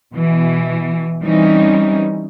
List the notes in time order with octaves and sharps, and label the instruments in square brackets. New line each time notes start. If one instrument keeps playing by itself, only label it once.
[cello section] B2 E3
E3 G3 C4 C#4 D#4